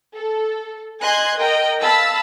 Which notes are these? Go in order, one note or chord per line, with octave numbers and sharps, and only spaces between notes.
A4
D#5 G#5 C6 F#6 G#6
A#4 D#5 G5
F5 A5 B5 E6